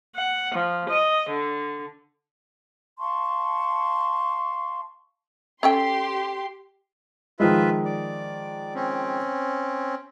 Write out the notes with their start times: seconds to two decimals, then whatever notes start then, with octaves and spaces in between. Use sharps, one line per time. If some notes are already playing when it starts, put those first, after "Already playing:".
0.15 F#5
0.54 F3
0.89 D#5
1.29 D3
2.98 F5 A5 C6 C#6
5.63 C#4 G4 A4 G5 C6
7.40 D#3 F3 G#3 F4 B4 E5
7.85 D5
8.75 C4 C#4